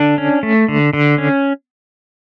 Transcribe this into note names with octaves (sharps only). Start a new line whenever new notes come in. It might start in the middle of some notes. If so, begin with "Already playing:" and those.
Already playing: D3 D4
C#4
A3
D3
D3
C#4